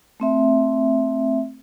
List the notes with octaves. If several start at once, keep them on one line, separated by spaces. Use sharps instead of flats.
A3 C4 E5